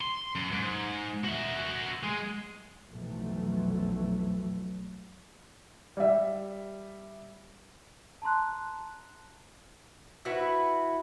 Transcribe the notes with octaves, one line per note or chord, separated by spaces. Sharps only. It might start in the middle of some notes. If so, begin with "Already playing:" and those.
C6
F#2
G#2
F#4 E5
G#3
B1 F2 E3 F#3 A3
G3 E5
A5 A#5 C6 F#6
E4 F#4 B4